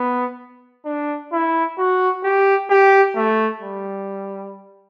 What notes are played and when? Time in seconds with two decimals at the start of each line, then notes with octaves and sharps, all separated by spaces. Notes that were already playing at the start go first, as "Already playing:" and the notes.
Already playing: B3
0.85 D4
1.32 E4
1.78 F#4
2.24 G4
2.70 G4
3.16 A3
3.62 G3